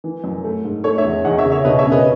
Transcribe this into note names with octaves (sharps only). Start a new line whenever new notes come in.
E3
F#2
A3
G#2
A3 A4 C#5
C#5 E5
E2
E2 D#5 F#5
C#5 E5
C#3
C#5 E5
B2 B4 D#5
C#5 E5
C#4
B4 D#5